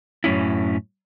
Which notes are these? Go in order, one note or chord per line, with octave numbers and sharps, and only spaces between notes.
F#2 A2 C#4 E4